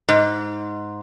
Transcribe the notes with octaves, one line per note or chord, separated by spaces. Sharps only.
G#2